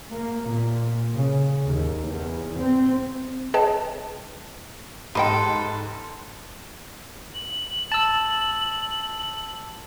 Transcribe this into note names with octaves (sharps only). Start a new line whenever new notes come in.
A#3
A#2
C#3
D#2
E2
C4
G#4 B4 C#5 D#5 G5 A5
G#2 G4 A4 D#5 G5 B5 C6 D#7
F#7
A5 E6